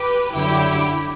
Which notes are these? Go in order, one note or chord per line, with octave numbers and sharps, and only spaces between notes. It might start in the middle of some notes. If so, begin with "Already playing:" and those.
Already playing: G4 B4
F#2 D3 F#3 E4 G4